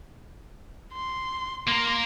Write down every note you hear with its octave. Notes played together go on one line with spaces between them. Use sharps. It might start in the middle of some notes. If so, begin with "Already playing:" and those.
C6
A#3 A#4 C6